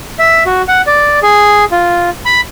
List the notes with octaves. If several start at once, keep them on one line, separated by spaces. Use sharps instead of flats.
E5
F#4
F#5
D5
G#4
F4
B5